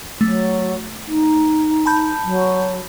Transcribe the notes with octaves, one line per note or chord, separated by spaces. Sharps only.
F#3 A3
D#4
A5 B5 G6
F#3